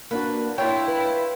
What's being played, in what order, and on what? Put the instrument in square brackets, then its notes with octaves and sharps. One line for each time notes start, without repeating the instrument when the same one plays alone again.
[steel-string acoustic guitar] A#3 D4 F#4 [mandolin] B4
[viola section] E4 [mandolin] F4 G5 [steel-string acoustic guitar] C#5
[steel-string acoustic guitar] B4